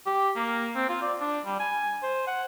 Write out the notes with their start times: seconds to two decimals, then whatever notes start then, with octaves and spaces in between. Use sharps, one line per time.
0.06 G4
0.36 A#3
0.75 C4
0.89 F4
1.02 D5
1.21 D4
1.45 G3
1.60 G#5
2.03 C5
2.27 F#5